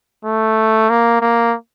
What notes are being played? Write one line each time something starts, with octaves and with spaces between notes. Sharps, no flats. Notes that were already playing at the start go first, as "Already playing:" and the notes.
A3
A#3
A#3